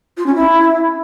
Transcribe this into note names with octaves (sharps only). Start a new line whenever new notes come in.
F4
C#4
E4